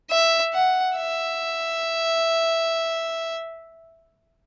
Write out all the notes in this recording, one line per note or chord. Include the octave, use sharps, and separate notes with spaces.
E5
F#5
E5